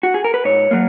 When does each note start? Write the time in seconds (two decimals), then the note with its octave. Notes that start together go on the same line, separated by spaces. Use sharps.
0.03 F#4
0.14 G#4
0.24 A#4
0.34 B4
0.45 G#2 C#5
0.71 F#3 A#3